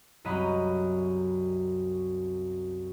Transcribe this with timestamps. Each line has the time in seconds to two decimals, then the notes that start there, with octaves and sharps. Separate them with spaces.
0.24 C2 F#2 F#4 D#5 A#5 B5